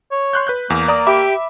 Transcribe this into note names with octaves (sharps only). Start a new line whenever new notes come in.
C#5
C6 F#6 G6
B4 F#6 G6
E2 A#3
D5 A#5 D#6
G4 E5 B5 D6